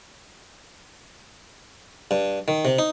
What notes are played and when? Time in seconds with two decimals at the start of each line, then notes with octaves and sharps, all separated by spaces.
2.11 G2
2.48 D#3
2.65 C3
2.79 D#4